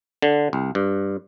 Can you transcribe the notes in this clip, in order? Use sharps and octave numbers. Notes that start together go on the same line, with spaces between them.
D3
C2
G2